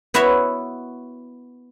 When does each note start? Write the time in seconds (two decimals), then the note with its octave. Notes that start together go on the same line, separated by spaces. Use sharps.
0.14 B3 E4 F#4 C#5 E5